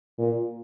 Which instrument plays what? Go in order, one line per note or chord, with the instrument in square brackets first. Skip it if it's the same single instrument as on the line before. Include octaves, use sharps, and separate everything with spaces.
[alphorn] A#2